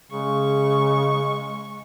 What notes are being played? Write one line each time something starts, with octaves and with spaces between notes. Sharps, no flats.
C#3 G#3 C#6